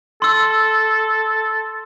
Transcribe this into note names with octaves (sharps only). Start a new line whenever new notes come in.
A4 C6 E6